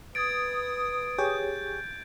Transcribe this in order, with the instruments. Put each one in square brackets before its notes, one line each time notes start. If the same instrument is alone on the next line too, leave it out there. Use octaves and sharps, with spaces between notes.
[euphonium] B4 [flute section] D#6 [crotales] G#6 A6 D7
[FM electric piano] G4 G#4 C#5 [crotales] G6